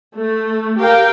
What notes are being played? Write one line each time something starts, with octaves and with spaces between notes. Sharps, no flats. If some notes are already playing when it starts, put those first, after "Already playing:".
A3
G4 A#4 F5 G5